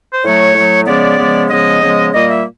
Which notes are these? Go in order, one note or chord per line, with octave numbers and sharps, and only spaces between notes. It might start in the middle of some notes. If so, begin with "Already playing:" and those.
C5
A2 F#3 A3 C#5
A2 F#3 A3
C#3 F3 G#3 B3 D5
C#3 F3 G#3 B3
C#3 F3 G#3 B3 D#5
C#3 F3 G#3 B3
A#2 G3 A#3 D#5
E5